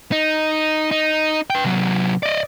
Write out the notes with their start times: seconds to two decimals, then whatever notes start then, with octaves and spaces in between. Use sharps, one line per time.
0.12 D#4
0.91 D#4
1.50 B4 G5
1.64 C3 F#3
2.23 D5 D#5